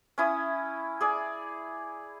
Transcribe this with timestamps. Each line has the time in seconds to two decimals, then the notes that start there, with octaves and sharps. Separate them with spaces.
0.18 C#4 E4 D#6
1.01 G#4 D5